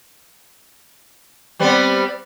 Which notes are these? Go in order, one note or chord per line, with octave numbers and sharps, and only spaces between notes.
G3 B3 C4